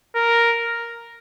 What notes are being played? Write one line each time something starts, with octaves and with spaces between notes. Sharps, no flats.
A#4